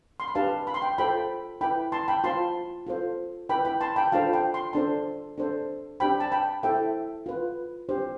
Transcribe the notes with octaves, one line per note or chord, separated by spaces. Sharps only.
C6
B5
D4 G4 B4 F5 A5
B5
C6
G5 B5
F4 A4 C5 G5 B5
E4 B4 G5 B5
A5 C6
G5 B5
F4 C5 A5 C6
F4 A4 C5
E4 B4 G5 B5
G5 B5
A5 C6
G5 B5
D4 F4 A4 C5 F5 A5
G5 B5
C6
D4 A4 C5 A5 C6
D4 A4 C5
D4 G4 C5 G5 B5
A5
G5 B5
E4 A4 C5 E5 G5
F4 B4
D4 G4 C5